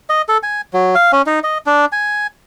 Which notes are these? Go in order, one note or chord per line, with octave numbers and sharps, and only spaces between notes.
D#5
A4
G#5
F#3
F5
C#4
D#4
D#5
D4
G#5